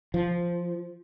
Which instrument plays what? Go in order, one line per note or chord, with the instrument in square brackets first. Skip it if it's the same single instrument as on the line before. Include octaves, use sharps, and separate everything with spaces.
[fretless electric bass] F3